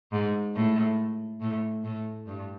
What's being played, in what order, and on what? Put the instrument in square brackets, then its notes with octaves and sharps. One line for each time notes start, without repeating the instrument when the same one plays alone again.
[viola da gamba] G#2
A2
A2
A2
G2